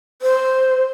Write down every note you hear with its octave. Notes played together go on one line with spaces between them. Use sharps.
C5